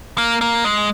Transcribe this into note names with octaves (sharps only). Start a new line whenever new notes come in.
A#3
A#3
G#3